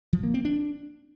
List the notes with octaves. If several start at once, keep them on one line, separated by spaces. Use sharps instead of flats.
F3
A#3
C4
D4